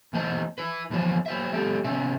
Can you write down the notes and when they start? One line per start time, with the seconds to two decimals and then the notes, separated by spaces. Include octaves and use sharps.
0.13 E2 A3 C5 D#5 A5
0.58 E4 B4
0.90 E2 F3 F#3 B4 C5
1.26 F#3 C5 E5
1.52 F#3 G#3 G4 A4
1.84 C3 C#4 F#4 E5